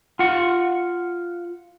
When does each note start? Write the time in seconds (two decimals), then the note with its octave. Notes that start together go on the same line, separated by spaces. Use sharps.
0.19 F4 F#5